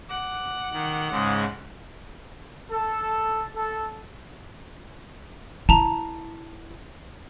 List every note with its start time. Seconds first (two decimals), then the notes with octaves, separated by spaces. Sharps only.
0.10 F#5 D6
0.73 D#3
1.11 G#2 C#3 G#3
2.71 A4
3.55 A4
5.69 E4 A5 A#5